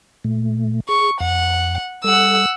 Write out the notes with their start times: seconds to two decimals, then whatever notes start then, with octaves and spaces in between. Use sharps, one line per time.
0.24 A#2 A3
0.89 G#4 C#6
1.20 F2 F#5
2.04 G3 A4 F#5 E6